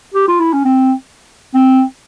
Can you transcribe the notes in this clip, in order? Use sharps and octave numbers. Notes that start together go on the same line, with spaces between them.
G4
F4
E4
C#4
C4
C4